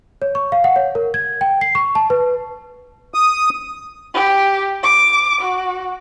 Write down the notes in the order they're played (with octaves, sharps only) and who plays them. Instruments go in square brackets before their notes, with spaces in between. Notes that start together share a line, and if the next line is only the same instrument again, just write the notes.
[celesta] C#5
C#6
F5
F#5
C#5
A#4
G#6
G5
C7
C#6
A5
B4
[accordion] D#6
[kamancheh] G4
D6
F#4